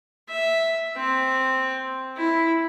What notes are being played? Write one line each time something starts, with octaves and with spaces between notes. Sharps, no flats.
E5
C4
E4